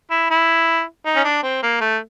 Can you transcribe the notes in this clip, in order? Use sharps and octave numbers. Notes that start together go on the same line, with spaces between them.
E4
E4
D#4
C#4
D4
C4
A#3
A3